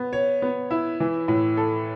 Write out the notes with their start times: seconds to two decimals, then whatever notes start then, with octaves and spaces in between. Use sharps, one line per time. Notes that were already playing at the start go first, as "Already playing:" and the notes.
Already playing: B3
0.13 C#5
0.42 B3
0.71 E4
1.00 E3
1.28 A2
1.57 A4